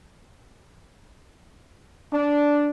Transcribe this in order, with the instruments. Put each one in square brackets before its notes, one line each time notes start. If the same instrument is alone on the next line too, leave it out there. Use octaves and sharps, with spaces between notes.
[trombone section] D4